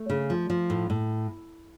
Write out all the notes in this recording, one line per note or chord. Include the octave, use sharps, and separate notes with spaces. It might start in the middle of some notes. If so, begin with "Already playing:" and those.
Already playing: A3
C#3
F3
F3
A2
A2